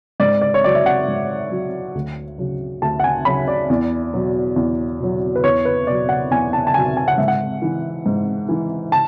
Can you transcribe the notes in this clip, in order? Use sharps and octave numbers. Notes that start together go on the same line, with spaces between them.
G#2 D5
D5
C#5
F#3 D5
E5
F#5
G#2
F#3
D2
C#3 F#3
D2 A5
F#5
G#5
C#3 F#3 B5
D5
E2
B2 F#3
E2
B2 F#3
B4
E2 C#5
B4
B2 F#3 D5
F#5
E2 G#5
A5
A5
B2 F#3 G#5
G#5
F#5
G#2 E5
F#5
E3
G#2
E3
A5